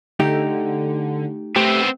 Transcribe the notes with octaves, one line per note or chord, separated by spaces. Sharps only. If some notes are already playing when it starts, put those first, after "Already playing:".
D3 A3 D#4 G4
A3 B3 C4 G4